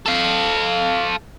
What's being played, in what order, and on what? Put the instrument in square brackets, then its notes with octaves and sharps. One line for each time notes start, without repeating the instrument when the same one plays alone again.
[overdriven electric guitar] A4 F5